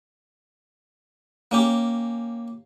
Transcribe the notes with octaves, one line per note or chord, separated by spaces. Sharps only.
A#3 C#4 G4